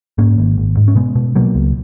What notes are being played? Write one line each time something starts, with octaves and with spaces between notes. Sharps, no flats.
G#2 A#3 C#4
G#1
G#1
G#2
C#4
B2 G#3 B3
B2
B2 F#3 A#3
C#2